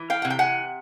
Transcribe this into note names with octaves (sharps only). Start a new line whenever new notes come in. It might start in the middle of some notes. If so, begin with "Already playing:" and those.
Already playing: E3
F5 G5
C3 F#5
G5
F#5 G#5